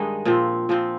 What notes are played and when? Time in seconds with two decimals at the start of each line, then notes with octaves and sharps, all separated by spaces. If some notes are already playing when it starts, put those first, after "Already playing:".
Already playing: G2 D#3 G#3 D4 D#4
0.25 A#2 F3 C4
0.69 A#2 F3 C4